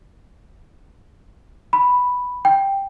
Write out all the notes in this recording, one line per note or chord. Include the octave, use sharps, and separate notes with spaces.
B5
G5